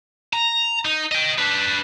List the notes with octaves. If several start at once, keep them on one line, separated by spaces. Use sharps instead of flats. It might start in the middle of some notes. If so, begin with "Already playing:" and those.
A#5
D#4
D#5 G5
D4 B4